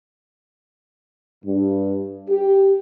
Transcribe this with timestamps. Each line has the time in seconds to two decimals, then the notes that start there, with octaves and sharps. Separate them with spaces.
1.44 G2
2.29 G4